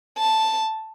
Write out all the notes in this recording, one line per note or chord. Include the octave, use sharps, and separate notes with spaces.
A5